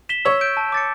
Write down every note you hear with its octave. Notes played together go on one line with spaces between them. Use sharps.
B6 E7 G7
C#5 E6
G6 D7
A5
D6 A6 C#7